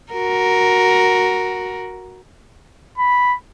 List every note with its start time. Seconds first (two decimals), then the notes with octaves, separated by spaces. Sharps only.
0.12 F#4 A#4
2.98 B5